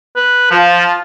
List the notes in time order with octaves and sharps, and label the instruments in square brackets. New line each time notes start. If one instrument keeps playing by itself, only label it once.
[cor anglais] B4
[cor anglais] F3 [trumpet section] F4 A5